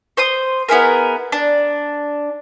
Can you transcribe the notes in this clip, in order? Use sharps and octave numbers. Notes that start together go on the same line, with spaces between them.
C5 C6 D#6
B3 E4 G#4 A#4
D4